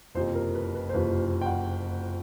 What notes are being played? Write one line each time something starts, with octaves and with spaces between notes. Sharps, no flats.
F#1 F2 C3 C5
A#4
B4
B4
C5
F#1 F2 C3 B4
G5
F#5